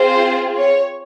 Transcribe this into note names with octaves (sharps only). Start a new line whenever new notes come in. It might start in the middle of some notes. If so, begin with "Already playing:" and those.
Already playing: C4 F4 G#4 C5
C#5